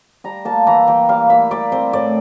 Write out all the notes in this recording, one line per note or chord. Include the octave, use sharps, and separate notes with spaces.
G3 A#5
A#3 A5
E3 A#5
E3 G5
G3 F5
A#3 E5
G3 D5
C4 C5
A2 D5